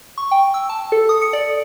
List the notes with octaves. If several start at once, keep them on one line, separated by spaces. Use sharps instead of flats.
C#6
G5
E6
A5
A4
D#6
C#7
D5